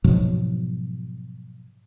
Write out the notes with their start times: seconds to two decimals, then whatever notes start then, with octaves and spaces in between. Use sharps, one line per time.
0.04 G#2 B2 F3 F#3